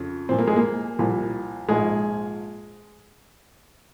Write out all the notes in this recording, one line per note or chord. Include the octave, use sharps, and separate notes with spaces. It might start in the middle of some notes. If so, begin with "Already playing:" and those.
Already playing: F2 C#3
C2 A#2 F3 C4
A#3
G#3
A#3
C2 A#2 F3
A#1 G#2 F3 G#3